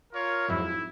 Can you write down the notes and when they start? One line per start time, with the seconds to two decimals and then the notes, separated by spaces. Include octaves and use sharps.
0.13 F4 A#4 C#5
0.48 F2 G#2 F#3 E4